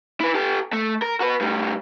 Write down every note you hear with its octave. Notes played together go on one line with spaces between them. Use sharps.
E4 B4
G4 A4
A3
A#4
F#4 B4
A2 G3